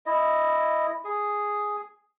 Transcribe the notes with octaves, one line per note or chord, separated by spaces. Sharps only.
E4 D#5
G#4